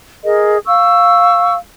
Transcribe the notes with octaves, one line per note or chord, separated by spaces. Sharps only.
G#4 A#4 D#5
F5 C#6 E6